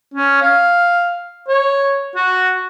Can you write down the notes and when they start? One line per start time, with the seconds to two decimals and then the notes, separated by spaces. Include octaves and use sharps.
0.14 C#4
0.42 F5
1.49 C#5
2.16 F#4